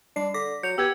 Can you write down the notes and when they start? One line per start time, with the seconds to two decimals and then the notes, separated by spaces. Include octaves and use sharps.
0.16 G3 D4 C7
0.34 D3 D6 A#6 B6
0.63 F#3 G6 C#7 F7
0.78 B3 G4 E6 G#6